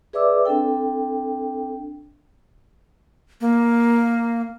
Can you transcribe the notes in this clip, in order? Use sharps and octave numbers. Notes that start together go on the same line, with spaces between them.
G#4 B4 D5 E5 D6 E6
C4 D4 A4 G5
A#3